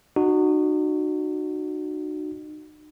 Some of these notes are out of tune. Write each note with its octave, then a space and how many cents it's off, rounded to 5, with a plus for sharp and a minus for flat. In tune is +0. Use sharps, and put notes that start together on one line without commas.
D#4 -40 F#4 +0